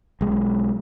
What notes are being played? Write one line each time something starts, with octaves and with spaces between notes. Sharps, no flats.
B1 G#3